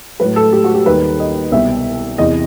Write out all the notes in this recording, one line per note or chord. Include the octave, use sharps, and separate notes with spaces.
A2 F#3 A3 B4
A4
G4
F#4
G4
D#2 D#3 G3 B4
D#5
C2 B2 G3 E5
E2 C3 E3 D#5